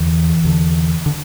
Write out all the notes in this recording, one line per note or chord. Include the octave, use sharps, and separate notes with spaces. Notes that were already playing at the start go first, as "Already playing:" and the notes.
Already playing: E2 D3 E3
E2 D3
D3